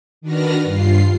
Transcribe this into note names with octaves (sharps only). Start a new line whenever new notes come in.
D#3 D4 F#4 B4 F6 A#6
G2 F4 C7